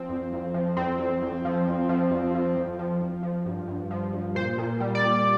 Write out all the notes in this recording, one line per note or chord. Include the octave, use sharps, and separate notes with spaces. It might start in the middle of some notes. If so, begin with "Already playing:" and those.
Already playing: F3 C4
F2
F2
F3
F2 C4
F2
F2
F3
F2
F3
F2
F3
F2
F3
F2
F3
G2
G2
F3
G2
A#2 C5
A#2
G3
D5
A#2